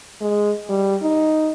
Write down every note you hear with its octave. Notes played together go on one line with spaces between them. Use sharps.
G#3
G3
D#4